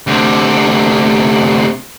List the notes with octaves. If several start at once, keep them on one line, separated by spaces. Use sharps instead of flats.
D2 C3